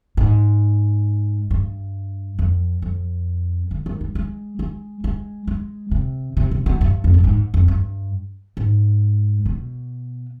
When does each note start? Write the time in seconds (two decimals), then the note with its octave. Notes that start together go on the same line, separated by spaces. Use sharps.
0.17 G#2
1.51 G2
2.39 F2
2.82 F2
3.71 D3
3.86 D#3
4.01 G3
4.15 G#3
4.59 G#3
5.04 G#3
5.47 G#3
5.91 C3
6.37 C3
6.51 C3
6.66 B2
6.81 G2
7.04 F2
7.14 G2
7.24 G#2
7.54 F2
7.68 G2
8.57 G#2
9.46 B2